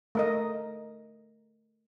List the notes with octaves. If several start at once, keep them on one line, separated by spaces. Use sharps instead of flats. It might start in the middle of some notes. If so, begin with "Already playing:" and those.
A3 A#4 D#5